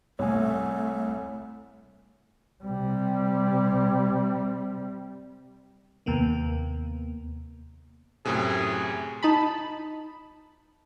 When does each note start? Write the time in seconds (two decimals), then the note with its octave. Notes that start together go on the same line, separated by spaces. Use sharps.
0.19 C2 A3 C#5 G#5
2.64 C3 G3
6.06 D#2 C3 A#3 B3
8.25 F#2 A2 C3 G#4
9.23 D#4 A5 B5